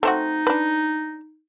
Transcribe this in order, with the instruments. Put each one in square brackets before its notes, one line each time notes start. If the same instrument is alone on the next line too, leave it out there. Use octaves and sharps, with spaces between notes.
[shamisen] A3 C4 F#4 [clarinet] D#4
[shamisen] D4 B4